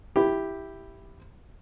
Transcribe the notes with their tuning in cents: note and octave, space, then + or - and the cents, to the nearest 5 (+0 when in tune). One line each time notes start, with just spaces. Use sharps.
E4 +0 G4 +0